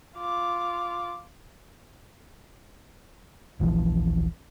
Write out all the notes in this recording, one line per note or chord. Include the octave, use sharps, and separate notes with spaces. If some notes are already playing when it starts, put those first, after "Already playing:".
F4 D6
D#1 A#1 E3 F3